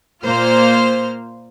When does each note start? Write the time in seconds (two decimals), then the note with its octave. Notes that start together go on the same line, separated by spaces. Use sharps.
0.23 A#2 A#3 F4 C5 F6